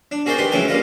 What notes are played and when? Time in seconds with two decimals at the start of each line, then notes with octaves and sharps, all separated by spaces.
0.11 D4
0.26 F#4 G#4 A#4 C5 D5 G5
0.38 D#3 G4 B4 C6 D#6
0.51 C#2 E3 F#3 G#3 G5 G#5
0.68 G3 A#3 F4 B4 D#5